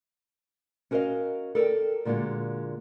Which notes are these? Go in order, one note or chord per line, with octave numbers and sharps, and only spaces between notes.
C#4 F#4 A#4 B4 D#5 F5
A4 A#4 D5 G5
A#2 D3 G#3 A#3 F4 F#4